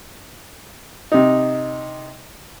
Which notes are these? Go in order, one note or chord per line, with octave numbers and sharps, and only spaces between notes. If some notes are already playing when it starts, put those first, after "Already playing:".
C3 D#4